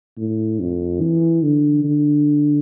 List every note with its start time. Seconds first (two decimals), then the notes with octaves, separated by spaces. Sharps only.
0.17 A2
0.60 F2
1.01 E3
1.42 D3
1.84 D3